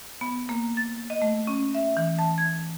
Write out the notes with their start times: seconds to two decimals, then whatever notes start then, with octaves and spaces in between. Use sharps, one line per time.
0.21 B3
0.49 A#3
0.77 A6
1.10 D#5
1.22 A3
1.47 C#4
1.75 E5
1.97 E3
2.19 A5
2.38 G#6